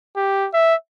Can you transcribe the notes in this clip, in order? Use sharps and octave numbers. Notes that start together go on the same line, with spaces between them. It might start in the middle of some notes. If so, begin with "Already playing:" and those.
G4
E5